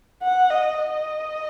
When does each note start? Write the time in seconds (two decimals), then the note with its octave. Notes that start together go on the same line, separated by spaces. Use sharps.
0.22 F#5
0.50 D#5
0.78 D#5